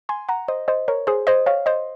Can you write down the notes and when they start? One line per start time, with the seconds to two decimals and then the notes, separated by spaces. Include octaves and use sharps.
0.09 G#5 C6
0.29 F#5 A#5
0.48 C5 D#5
0.68 C5 D#5
0.88 A#4 C#5
1.07 G#4 C5
1.27 C5 D#5
1.46 C#5 F5
1.66 C5 D#5